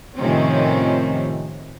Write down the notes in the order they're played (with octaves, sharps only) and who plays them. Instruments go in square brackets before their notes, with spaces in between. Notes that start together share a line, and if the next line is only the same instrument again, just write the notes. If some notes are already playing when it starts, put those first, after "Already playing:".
[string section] A2 C3 D#3 F3 C4 C#4